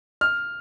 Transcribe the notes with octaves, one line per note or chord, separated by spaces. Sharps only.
F6